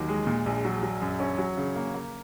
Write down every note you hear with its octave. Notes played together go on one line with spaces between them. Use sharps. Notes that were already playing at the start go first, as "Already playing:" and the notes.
Already playing: D#2 D#3 F#3
G#3
A#2
A#1
F#3
F#3
F#2
C#4
F#3
C#3
A#3
A#3